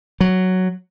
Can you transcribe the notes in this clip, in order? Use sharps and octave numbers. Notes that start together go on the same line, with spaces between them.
F#3